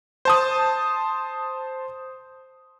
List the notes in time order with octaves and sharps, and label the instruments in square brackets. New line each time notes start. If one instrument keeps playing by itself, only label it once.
[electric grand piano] C5 A5 D#6